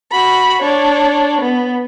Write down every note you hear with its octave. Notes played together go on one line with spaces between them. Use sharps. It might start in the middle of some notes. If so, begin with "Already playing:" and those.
F#4 B5
D4 C#5
B3